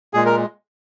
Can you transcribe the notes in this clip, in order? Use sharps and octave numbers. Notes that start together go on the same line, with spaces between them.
A#2 G#3 G#4
A#4